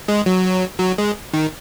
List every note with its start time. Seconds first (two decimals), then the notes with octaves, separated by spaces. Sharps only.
0.08 G#3
0.26 F#3
0.80 F#3
0.98 G#3
1.33 D#3